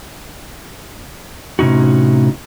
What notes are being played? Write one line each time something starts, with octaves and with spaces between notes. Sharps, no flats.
A2 C3 C#4 D#4 F#4